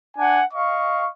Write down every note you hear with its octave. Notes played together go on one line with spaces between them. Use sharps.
D4 F#5 G#5 A5
D#5 F5 C#6